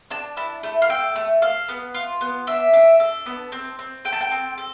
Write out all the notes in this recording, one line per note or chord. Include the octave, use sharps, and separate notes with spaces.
D4 A5
E4 A5
A3
F5
A4 G5
A3
A4 F5
B3
F4
B3
D4 E5
D4
A4
B3
C4
C4
A4 G5
A5
G5
C4
A4